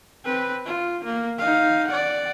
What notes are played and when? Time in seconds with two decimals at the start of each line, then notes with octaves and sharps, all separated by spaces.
0.25 C4 B4
0.66 F4
1.05 A#3
1.38 D#4 F5
1.88 D5 F#5